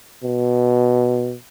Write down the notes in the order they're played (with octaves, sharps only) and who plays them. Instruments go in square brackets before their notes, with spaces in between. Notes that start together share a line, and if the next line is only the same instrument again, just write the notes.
[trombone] B2